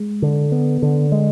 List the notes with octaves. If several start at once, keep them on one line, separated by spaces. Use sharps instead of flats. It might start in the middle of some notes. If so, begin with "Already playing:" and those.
Already playing: G#3
D3
B3
D3
G#3